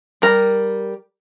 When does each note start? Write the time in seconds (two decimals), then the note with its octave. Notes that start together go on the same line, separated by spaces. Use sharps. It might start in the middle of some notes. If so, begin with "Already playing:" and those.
0.22 G3 A#4